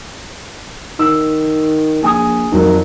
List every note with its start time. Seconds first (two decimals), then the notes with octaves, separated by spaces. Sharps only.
0.99 D#3 E6
2.03 A#1 G#4 G#5 D#6
2.52 F2 D#3 F#3 A#4